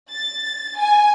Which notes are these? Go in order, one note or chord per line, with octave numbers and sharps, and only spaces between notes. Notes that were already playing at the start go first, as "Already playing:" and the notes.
A6
G#5